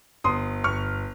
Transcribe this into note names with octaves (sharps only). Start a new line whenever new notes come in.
G1 C6 D#6
G1 C#6 F6